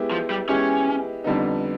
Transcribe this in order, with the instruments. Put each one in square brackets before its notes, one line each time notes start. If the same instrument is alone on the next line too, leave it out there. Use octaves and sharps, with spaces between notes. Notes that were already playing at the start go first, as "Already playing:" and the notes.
Already playing: [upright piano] G#3 B3 E4 G4
[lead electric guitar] F3
G3
[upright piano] G#3 B3 E4 G4 [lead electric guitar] C#4
[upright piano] F2 D3 G3 B3 D#4